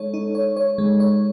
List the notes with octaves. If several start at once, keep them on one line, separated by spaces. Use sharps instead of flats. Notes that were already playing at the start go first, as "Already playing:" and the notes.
Already playing: G#3 D#4 A4 C#5
D#4
C#5
C#5
G#3
C#5